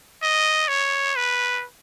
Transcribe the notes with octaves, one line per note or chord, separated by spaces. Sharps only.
D#5
C#5
B4